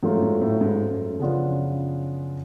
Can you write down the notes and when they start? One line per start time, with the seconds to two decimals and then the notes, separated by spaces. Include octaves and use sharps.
0.03 G#2 F#3 A3 F4
0.15 F#2
0.22 G#2
0.41 A2
0.61 G#2
0.90 F#2
1.19 C#3 F3 B3 D4 F4
1.49 F#2